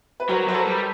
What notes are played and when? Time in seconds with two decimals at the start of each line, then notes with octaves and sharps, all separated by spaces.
0.20 B4
0.29 F#3 A#4 C5
0.48 F#3 C5
0.54 A4 B4
0.67 G3